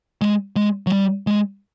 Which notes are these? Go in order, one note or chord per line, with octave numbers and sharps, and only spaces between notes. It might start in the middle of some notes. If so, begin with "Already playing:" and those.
G#3
G#3
F#3
G3
G#3